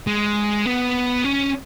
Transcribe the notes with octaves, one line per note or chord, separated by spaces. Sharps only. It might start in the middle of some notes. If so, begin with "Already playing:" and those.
G#3
B3
C#4